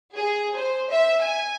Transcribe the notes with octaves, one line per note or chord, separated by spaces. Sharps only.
G#4
C5
E5
G#5